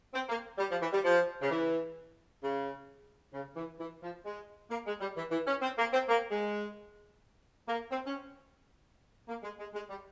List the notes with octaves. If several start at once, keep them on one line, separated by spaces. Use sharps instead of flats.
C4
A#3
G3
F3
E3
G3
F3
C#3
E3
C#3
C#3
E3
E3
F3
G#3
A#3
G#3
G3
E3
E3
C#4
C4
A#3
C4
A#3
G#3
A#3
C4
C#4
A#3
G#3
G#3
G#3
G3